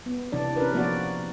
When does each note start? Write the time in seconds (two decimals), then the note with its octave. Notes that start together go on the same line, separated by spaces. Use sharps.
0.06 B3
0.32 C3 E3 D4 D5
0.56 C#4 A#4 B4
0.73 F3 A#3 B3 F#4 D5